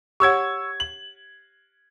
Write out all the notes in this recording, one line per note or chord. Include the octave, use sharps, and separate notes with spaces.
G4 C#5 F#5 C#6 E6 G#6
F#7